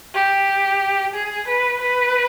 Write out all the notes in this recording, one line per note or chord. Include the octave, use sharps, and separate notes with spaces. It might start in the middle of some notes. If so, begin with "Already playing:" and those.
G4
G#4
B4
B4